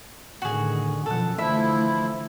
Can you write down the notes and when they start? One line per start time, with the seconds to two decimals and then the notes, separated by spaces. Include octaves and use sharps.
0.42 A2 D3 D#3 F#4 G#4
1.06 F#2 B2 F3 A4 F#5
1.38 D3 E3 F3 A3 E4 E5